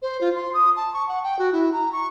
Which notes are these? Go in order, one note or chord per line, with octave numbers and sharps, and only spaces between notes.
C5
F4
C6
D#6
A5
C#6
F#5
G5
F#4
E4
A#5
C#6